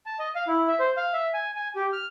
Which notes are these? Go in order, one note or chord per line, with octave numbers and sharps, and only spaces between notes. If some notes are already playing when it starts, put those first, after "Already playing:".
A5
D#5
F5
E4
E5
C5
F5
E5
G#5
G#5
G4
F6